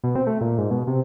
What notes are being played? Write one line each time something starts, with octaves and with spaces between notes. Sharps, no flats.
B2
C4
A3
A#2
G#2
B2
C3